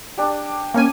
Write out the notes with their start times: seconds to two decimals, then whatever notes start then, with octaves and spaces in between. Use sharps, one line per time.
0.18 D4 G4
0.74 A#3 C#4 G#5